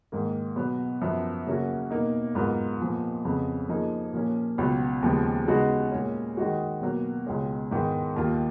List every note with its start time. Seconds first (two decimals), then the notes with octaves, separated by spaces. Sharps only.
0.12 G#2 D#3 A#3
0.56 B2 F#3 B3
1.01 F#2 F3 B3
1.46 C#3 F#3 A#3 C#4 F#4
1.90 B2 A#3 D#4
2.35 G#2 F#3 B3 F4 A#4
2.80 A#2 F3 B3
3.25 F2 C#3 F3 B3
3.69 F3 A#3 D#4 G#4
4.13 A#2 F3 A#3 C#4
4.58 C#2 B2 F#3 B3 F4
5.02 D#2 C#3 F3 G#3 B3
5.48 C#3 G#3 B3 D#4 F#4
5.92 A#2 G#3 C#4
6.37 D#3 G#3 D#4 F#4
6.81 B2 F#3 A#3
7.27 C#2 B2 G#3 C#4
7.71 G#2 D#3 G#3 B3
8.16 D#2 D#3 A#3 F4